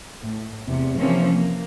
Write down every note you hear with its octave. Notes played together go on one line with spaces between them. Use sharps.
A2
E2 C3
C3 E3 F3 A#3 C4 C#4
A#3